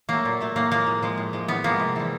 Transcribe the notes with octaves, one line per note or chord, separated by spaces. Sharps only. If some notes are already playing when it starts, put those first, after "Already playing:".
F#3 A3 A#3
A#2
F#3 A3
A2 A#3
F3 G#3 A#3
A2
F3 G#3
A2
F3 G#3
A2 B3
F3 G#3 A#3
C3
E3 G3